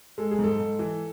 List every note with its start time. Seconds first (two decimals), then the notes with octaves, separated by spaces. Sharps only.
0.18 G#3 A4
0.31 G#4
0.39 G#2 A4
0.59 G#2
0.79 E3